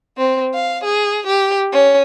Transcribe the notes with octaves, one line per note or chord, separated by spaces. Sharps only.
C4
F5
G#4
G4
C#4